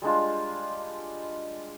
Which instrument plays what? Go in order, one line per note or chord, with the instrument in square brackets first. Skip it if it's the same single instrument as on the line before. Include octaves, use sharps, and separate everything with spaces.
[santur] G3 G#3 D4 F4